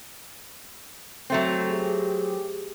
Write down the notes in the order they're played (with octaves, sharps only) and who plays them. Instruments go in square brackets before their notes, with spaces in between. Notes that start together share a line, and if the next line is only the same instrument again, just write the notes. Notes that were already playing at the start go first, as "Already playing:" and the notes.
[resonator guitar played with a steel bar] F#3 A3 C4
[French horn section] G4 G#4